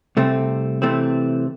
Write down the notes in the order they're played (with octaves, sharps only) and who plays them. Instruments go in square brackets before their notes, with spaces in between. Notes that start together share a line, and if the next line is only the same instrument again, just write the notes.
[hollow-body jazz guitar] C2 C3 A3 C4
C3 E3 A3 C4